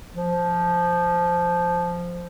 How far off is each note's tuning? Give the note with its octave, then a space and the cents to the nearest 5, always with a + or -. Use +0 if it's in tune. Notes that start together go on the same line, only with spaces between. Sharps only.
F3 -5